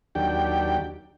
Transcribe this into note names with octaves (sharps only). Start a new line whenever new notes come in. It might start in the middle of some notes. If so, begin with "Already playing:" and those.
D#2 F#3 D4 G4 G5